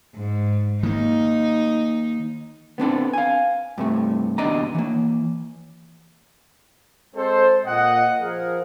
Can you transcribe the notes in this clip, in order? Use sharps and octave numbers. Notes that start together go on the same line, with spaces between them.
G#2
D#3 A#3 D#4
B3 C4 D4 A4
F5 G#5
G2 C3 A3
D#2 B2 D4 D5 D#5 A#5
E3 A#3
G#3 C4 A4 C5
A#2 D#5 F#5
F3 G#4 A#4